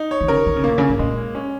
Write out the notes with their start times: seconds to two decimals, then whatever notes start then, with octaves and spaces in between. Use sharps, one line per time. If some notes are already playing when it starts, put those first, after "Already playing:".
Already playing: D#4
0.11 C#5
0.21 D#3
0.28 C#3 A#4
0.46 D#3
0.56 C#3
0.64 A#2 A#3
0.78 C#3
0.89 G#2
0.99 A#2 G#3
1.35 C#4